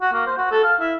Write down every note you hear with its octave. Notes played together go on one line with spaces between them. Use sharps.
F#4
A#3
C5
F#4
A4
F5
E4